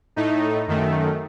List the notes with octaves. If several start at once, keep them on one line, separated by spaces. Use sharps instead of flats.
A2 A3 D#4
F#2 D#3 A3